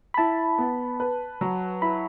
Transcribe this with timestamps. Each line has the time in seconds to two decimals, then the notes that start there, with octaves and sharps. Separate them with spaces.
0.14 B5
0.18 E4 A5
0.58 B3
1.00 B4
1.41 F#3
1.82 E4 B5